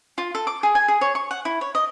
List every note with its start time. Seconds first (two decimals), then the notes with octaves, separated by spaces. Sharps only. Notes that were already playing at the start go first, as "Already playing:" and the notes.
0.18 F4
0.35 A4
0.47 D6
0.63 G#4
0.75 G#5
0.88 G#4
1.01 C#5
1.15 C#6
1.31 F#5
1.45 E4
1.61 C#5
1.75 D#5